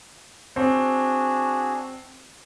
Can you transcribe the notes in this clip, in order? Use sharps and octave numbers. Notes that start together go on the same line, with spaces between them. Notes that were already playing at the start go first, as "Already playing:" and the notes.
C4 D4 F#4 G#4